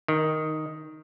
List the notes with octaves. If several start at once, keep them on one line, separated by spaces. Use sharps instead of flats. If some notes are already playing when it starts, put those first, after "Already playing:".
D#3